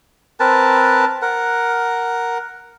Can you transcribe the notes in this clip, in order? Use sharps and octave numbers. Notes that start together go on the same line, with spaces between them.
C4 A#4 B4 A5
A#4 F#5